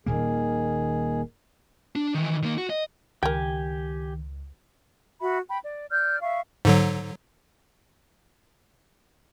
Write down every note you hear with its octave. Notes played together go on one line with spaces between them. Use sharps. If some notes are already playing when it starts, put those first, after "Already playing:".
D#1 A#2 D#3 A#3 G#4
D4
D#3 E3
D#3 A#3
F#4
D#5
C#2 D#3 G4 A#4 G5 G#5
F#4 E5 B5
G5 B5
D5
D5 F6 G6
E5 F5 C#6
G#2 D3 F#3